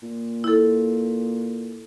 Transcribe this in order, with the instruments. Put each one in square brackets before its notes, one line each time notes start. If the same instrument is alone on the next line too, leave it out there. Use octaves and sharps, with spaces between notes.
[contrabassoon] A#2
[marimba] E4 A4